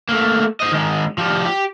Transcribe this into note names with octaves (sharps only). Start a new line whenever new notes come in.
A3 A#3
C5 D#5
D#3 G#3
F3 G3
G4